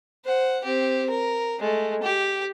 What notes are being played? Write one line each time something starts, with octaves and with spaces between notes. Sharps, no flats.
C5 F#5
C4 G4
A#4
G#3 A3
G4